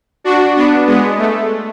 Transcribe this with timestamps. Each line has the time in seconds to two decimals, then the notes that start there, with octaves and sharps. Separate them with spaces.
0.24 D4 F#4
0.56 B3 D4
0.87 G#3 B3
1.18 A3